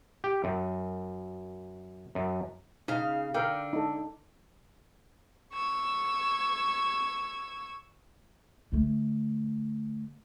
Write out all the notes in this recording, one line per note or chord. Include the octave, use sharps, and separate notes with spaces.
G4
F#2
F#2
C#3 D#4 F5
D3 A#4 F5 G5
D#4 A4
C#6 E6 G#6
D3 A3